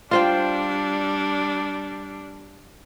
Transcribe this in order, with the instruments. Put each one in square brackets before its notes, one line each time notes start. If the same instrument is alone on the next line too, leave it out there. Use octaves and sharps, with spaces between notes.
[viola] G3 D4 [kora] F4 C5 G5